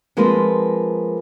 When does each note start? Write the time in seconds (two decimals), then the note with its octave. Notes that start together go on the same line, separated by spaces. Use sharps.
0.17 F3 G#3 A#3 C4 B4